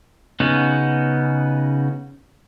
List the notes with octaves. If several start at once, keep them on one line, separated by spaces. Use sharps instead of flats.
C#3 B3 C#4 D#4 F#4